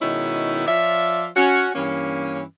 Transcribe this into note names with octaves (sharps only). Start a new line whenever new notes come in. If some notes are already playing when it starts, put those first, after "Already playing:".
B2 D#3 G#3 C#4 D#4 E4
F3 F4 C#5 D5 E5
C#4 F#4
G2 E3 A#3 C#4